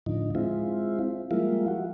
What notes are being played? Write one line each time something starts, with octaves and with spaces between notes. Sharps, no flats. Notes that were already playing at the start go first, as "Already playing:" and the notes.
A2 D3 F3 D#4
G#3 C4 E4 F4
F3 G3 G#3 A#3 E4 F4
F#4